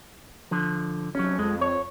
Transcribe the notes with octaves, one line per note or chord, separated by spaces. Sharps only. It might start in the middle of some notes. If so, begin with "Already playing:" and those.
D3 F3
F1 F#3 C#4
F2 G#3
C#5